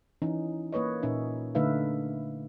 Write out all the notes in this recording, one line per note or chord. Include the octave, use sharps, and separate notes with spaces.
E3 C#4 D#4
A#3 B4 C#5 D#5
A#2 C#4 D#4 E5
D3 A3 D#4 B4 E5 F5